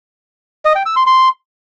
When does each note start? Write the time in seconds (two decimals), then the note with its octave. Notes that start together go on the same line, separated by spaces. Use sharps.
0.65 D#5
0.75 G5
0.86 E6
0.96 C6
1.07 C6